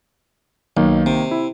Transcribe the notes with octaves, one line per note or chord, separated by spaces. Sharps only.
B1 D#3 A#3
C3
E4